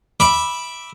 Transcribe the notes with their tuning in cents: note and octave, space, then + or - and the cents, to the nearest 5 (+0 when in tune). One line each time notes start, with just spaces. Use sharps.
E5 -5 B5 -10 D6 +0